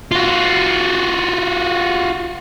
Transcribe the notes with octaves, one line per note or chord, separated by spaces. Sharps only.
F4 F#4